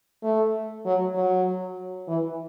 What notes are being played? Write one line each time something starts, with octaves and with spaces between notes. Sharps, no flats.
A3
F#3
F#3
E3